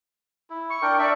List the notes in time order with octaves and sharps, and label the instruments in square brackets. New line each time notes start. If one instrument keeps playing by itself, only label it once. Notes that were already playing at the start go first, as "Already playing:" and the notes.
[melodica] E4
[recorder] C#6
[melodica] D4 A#4 G5
[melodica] D4 E5 C#6 [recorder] D5